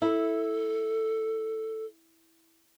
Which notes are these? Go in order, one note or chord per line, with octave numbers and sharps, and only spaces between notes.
E4 A4